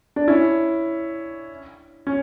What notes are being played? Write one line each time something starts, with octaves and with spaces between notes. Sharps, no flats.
D4
C#4 E4
C#4